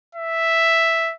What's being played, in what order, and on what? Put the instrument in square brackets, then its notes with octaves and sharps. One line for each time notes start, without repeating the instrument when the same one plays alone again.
[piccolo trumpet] E5